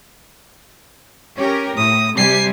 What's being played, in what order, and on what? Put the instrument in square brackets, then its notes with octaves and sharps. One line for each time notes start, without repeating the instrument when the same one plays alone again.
[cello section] C#4 G4 A#4
[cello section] A2 [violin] D#6
[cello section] C3 G3 G4 [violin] G#5 C7